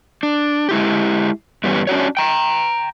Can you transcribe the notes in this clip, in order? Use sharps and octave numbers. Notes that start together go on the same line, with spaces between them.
D4
G#3 E4 G4
G2 E3 G3 B3 C#4
C#4 D4 F#4 C#5
G5 A#5